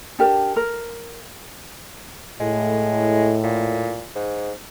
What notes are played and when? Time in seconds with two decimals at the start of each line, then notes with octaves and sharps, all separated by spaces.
0.19 D4 G4 A#4 A5
0.56 A#4
2.40 A2 G#3
3.43 A#2
4.15 G#2